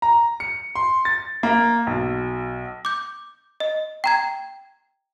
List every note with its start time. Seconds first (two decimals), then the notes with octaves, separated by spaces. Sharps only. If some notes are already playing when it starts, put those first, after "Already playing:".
0.02 A#5
0.40 C#7
0.75 C6
1.05 A6
1.43 A#3
1.87 B1
2.85 D6 G6
3.60 D#5
4.04 G5 A#5 G#6